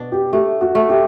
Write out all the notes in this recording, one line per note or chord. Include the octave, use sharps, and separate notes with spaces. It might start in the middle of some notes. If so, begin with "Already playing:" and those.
Already playing: B2 D4
G4
A3 G4
F#4
A3
G4